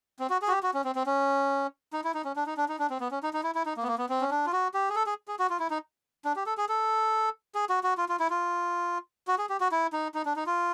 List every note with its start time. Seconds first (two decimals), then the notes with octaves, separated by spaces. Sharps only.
0.19 C4
0.30 F#4
0.42 G#4
0.48 F#4
0.52 G4
0.63 F#4
0.74 C#4
0.84 C4
0.95 C4
1.06 C#4
1.93 D#4
2.04 E4
2.14 D#4
2.25 C#4
2.36 D4
2.46 D#4
2.57 D4
2.69 D#4
2.79 D4
2.90 C4
3.01 B3
3.11 C#4
3.23 D#4
3.33 D#4
3.44 E4
3.55 E4
3.66 D#4
3.77 A#3
3.83 B3
3.88 A#3
3.98 B3
4.09 C4
4.21 C#4
4.31 D4
4.46 F4
4.53 F#4
4.74 G4
4.90 G#4
4.96 A4
5.06 G#4
5.28 G#4
5.39 F#4
5.50 F4
5.60 E4
5.71 D#4
6.25 D4
6.36 G4
6.46 A4
6.58 G#4
6.69 A4
7.55 G#4
7.70 F#4
7.84 F#4
7.98 F4
8.09 F4
8.20 E4
8.30 F4
9.28 F#4
9.38 G#4
9.49 G4
9.60 F#4
9.72 E4
9.93 D#4
10.15 D#4
10.26 D4
10.36 D#4
10.46 F4